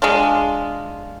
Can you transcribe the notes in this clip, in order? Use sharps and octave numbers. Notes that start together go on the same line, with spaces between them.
G#3 D4 F4